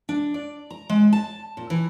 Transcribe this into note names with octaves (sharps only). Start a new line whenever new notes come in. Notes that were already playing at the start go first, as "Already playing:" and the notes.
D4
D5
A#5
G#3
A5
A#2
E3